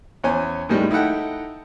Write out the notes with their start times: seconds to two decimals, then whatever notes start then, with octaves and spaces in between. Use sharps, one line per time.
0.24 E2 C#4 C5 C#5 G#5
0.69 A2 D#3 G3 G#3
0.91 D#4 E4 A4 F#5 G5